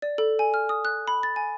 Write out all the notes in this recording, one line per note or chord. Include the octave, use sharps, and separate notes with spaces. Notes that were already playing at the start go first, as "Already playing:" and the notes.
D5
A4
G#5
F6
D#6
F#6
B5
A6
G#5